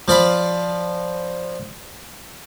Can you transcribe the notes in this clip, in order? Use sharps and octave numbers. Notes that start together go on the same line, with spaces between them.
F3 D5 F5 B5